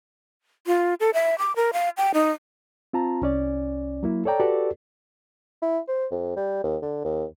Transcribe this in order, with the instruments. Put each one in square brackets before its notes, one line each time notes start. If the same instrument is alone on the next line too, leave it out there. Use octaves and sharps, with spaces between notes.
[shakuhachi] F4
A4
E5
D6
A#4
F5
G5
D#4
[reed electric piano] C4 F4 A5 A#5
C2 C#4 D5
F#3 A#3 E4
A4 C#5 D5 G5 A#5
F#4 G4 A4 B4 D5
[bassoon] E4
C5
F2
G3
D#2
D3
D#2